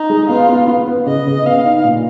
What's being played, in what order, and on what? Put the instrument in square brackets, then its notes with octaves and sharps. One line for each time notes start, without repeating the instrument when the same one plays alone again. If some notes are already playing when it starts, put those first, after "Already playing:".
Already playing: [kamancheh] D#4
[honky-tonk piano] G#3
[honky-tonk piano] B3 [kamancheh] F4
[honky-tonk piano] B3
B3
B3
[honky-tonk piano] C#3 [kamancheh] D#5
[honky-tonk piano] C#3
[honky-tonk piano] B3 [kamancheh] F5
[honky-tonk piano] D#4
A#2